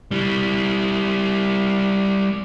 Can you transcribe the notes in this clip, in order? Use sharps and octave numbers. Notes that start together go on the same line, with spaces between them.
G3 E4